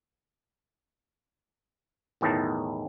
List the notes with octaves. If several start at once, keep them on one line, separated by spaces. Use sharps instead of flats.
B1 E2 A2 D#3 D#4 A5